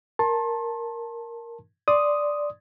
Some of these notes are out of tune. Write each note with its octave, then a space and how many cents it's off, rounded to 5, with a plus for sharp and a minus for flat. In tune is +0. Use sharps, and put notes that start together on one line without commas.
A#4 +0 A5 +0 C6 +35
D5 +0 C6 +0 D#6 +0